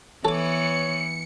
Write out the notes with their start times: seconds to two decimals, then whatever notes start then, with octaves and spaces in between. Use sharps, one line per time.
0.25 E3 B3 A4 C#5 D6 C#7